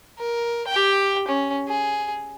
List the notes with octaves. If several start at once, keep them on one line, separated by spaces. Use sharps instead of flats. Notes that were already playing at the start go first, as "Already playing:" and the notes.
A#4
G4 G5
C#4
G#4